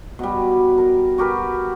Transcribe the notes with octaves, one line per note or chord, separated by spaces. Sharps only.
B2 G3
A#4
F#4 G4 A#4 B4